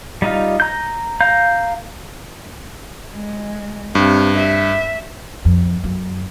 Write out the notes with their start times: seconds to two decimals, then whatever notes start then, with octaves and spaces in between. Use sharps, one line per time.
0.22 G3 D#4 F4
0.60 A#5 G6
1.21 F5 A#5 G6
3.16 G#3
3.95 G2 C3
4.38 E5
5.45 F2
5.84 F#2